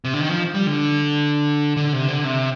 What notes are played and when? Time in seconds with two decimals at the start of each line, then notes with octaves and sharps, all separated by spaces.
0.04 C3
0.14 D3
0.21 D#3
0.29 F3
0.54 G3
0.67 D3
1.77 D3
1.93 C3
2.08 D3
2.24 C3